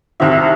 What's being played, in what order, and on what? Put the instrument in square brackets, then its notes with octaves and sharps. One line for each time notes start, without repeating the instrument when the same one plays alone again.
[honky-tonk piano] C2 C3 D#3 E5